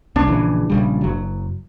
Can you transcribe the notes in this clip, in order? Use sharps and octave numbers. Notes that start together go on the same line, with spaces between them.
C2 C#4 D4
A#1 C#3 E3
A#1 C#3 G3
F#1 F#3